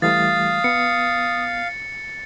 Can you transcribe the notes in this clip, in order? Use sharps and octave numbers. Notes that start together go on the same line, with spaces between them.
E3 G3 A3 F5 D#6 A6
B3 C#7